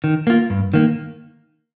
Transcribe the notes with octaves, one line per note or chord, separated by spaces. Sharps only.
D#3
A#3 F4
G2
D#3 A#3